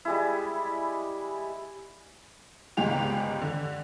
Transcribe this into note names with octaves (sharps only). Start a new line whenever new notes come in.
G3 G#3 E4
G1 C#2 G#2 G#3 G4 F7
D3